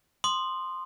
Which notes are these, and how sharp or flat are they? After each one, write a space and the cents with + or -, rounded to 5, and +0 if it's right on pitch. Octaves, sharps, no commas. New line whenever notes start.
C6 +0 D#6 -25